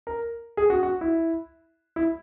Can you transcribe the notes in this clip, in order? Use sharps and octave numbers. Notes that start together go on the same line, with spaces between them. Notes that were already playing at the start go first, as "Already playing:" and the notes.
A#4
G#4
F#4
F#4
E4
E4